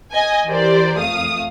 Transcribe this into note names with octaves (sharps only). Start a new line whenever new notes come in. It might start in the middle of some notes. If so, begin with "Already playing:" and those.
D#5 G#5
E3 G4 A#4 C5 D5
F2 A3 F5 D#6